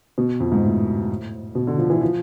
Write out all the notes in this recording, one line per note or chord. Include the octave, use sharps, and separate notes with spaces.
B2
F2
G#2
A2
B2
D3
F3
E3
F3